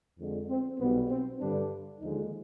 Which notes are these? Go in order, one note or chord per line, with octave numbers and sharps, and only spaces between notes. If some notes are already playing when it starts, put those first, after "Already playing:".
F2 D3 G#3
C4
B1 B2 G3 B3
C4
G2 D3 G3 D4
D#2 D3 F3 G#3 D#4